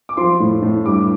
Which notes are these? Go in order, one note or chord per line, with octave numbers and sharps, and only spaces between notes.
D6
F3 C6
A2
A2
G2 D6